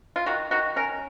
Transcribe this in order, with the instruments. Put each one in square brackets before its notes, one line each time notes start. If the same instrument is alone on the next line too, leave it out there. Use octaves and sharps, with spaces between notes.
[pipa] F4
D#3 F#4
D#3 F#4
C#4 A#4